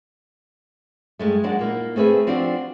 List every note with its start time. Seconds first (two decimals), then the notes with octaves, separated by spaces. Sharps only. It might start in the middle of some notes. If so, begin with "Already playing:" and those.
1.19 G2 G#3 A3
1.44 F#3 G#3 A#3 D4 F#5
1.59 A#2 A#3 D#4 E4
1.96 A3 C4 G#4 B4 E5
2.27 F3 C4 D4 F#4 G4 D5